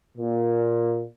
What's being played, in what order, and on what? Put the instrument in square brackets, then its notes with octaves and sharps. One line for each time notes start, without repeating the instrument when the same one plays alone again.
[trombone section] A#2